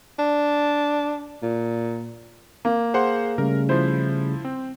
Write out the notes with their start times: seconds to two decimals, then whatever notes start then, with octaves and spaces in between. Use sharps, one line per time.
0.19 D4
1.43 A#2
2.65 A#3
2.94 G#4 C5 F#5 C6
3.38 C#3 G3 A3 A#4
3.69 F3 E4 C5
4.45 C4